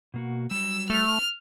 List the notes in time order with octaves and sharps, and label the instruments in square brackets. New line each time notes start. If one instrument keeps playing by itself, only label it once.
[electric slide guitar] B2 A#3 F#4
[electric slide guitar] F#3 G3 [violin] E6
[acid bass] A3 [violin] F6